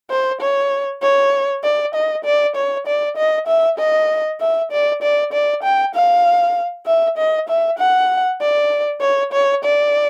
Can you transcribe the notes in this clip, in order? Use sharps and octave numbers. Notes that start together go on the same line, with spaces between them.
C5
C#5
C#5
D5
D#5
D5
C#5
D5
D#5
E5
D#5
E5
D5
D5
D5
G5
F5
E5
D#5
E5
F#5
D5
C#5
C#5
D5